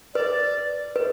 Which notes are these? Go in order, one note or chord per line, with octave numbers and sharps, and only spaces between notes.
B4 D5
B4